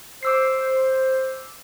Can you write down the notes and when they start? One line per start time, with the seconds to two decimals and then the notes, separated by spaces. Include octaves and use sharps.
0.23 C5 D6 E6 C7